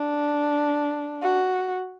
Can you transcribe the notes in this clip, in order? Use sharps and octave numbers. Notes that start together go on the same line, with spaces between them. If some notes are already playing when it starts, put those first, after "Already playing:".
Already playing: D4
F#4